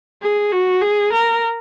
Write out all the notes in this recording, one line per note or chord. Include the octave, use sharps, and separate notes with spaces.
G#4
F#4
G#4
A#4